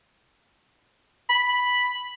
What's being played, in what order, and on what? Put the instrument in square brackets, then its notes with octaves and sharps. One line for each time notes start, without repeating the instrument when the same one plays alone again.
[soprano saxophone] B5